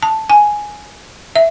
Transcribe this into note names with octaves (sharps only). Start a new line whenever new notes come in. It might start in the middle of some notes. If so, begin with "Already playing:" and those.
A5
G#5
E5